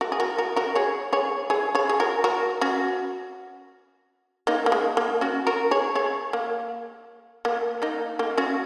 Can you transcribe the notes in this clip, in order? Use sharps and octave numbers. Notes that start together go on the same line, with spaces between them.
F#4 A#4
G#4
F#4 A#4
F#4 A#4
F#4 A#4
G#4 C#5
G#4 C#5
G#4 C#5
G#4 C#5
G#4
F#4 A#4
F#4 A#4
C#4 F#4
A#3 D#4
A#3
G#3
A#3
C#4 F#4
F#4 A#4
G#4 C#5
G#4 C#5
A#3
A#3
A#3 D#4
A#3 D#4
C#4 F#4